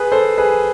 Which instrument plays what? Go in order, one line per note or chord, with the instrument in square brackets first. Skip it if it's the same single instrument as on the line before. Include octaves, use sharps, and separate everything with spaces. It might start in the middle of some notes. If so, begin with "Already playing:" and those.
Already playing: [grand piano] G#4 B4
A4 C5
G#4 B4